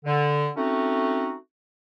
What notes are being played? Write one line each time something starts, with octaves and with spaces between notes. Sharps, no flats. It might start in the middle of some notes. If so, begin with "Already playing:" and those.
D3
A3 C4 C#4 D#4 F#4